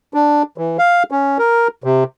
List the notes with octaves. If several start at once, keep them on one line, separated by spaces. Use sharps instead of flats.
D4
E3
F5
C#4
A#4
C3